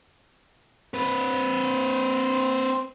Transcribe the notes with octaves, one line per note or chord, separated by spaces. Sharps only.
C4 B4